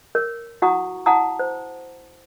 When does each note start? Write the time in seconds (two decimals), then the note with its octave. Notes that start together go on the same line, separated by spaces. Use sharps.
0.15 A#4 C#5
0.62 E4 F#4 F#5 A#5 C#6 D#6
1.06 E4 F#5 A5 A#5 D#6
1.39 C5